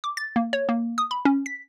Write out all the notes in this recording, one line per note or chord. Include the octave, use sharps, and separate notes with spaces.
D6
A6
A#3
C#5
A#3
D#6
B5
C#4
B6